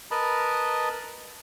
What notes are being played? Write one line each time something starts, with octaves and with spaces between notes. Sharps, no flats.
A#4 B4 D#5 A5 B5